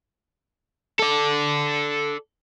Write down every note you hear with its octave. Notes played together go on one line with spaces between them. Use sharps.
A4 D5